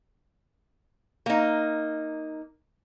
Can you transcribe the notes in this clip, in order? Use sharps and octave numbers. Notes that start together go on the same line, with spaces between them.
A#3 D#4